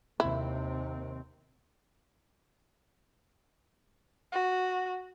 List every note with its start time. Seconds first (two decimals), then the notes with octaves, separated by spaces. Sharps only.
0.20 D#2 C3 C4 E4
4.32 F#4